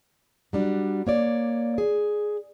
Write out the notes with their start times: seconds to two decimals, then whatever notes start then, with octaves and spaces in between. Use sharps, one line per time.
0.53 F#3 G3 D4
1.07 A#3 C#5 D5
1.78 G#4